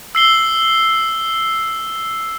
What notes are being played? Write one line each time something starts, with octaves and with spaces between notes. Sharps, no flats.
E6 C7 G7